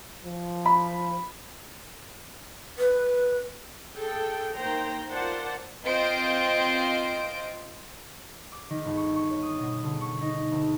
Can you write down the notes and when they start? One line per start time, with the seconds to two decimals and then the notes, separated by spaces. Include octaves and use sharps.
0.25 F3
0.66 B5
2.78 B4
3.97 G#4 A4 G5
4.57 D#3 A#3 C5 G5 A#5
5.10 F4 A#4 C5 D5 F#5 A5
5.84 C4 F4 C5 D#5 D7
8.52 D6
8.70 D#3
8.85 G1
8.97 C#6
9.16 C#6
9.30 C#5
9.42 D#6
9.60 B2
9.83 D3
10.01 C#6
10.21 D#4
10.52 D2